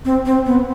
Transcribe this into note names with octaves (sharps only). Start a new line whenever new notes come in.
C4
C4
B3